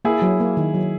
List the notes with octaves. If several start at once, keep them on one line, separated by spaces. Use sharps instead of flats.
A#3 E4 G#4
F#3
A#3
D#3
F#3